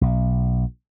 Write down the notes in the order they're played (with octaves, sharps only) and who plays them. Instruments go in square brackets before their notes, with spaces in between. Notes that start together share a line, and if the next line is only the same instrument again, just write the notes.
[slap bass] B1